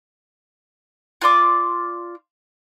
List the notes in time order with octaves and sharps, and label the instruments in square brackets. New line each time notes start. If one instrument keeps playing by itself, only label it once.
[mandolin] F4 D5 C6 D6